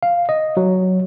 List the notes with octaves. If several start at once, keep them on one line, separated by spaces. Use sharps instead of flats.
F5
D#5
F#3